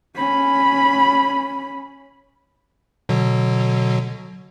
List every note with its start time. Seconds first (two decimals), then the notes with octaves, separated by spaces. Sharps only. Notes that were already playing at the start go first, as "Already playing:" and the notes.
0.16 C#4 B5
3.09 B2 D3 F#3